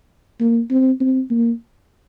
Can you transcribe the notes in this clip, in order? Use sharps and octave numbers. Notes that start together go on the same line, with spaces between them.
A#3
C4
C4
A#3